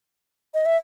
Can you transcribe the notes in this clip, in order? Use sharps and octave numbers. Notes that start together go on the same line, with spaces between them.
D#5
E5